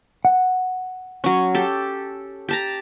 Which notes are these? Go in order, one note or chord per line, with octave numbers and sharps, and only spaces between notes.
F#5
F#3 C#4
G4 A4
G4 A5 A#5